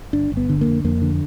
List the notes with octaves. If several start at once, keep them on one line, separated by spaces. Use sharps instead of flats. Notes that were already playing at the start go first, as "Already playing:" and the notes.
G1 D4
G1
B3
D3
A#3
F2
F2 A#3
D3